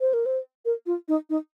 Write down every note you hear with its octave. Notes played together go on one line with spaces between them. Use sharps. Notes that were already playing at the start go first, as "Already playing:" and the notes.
C5
A#4
C5
A#4
F4
D#4
D#4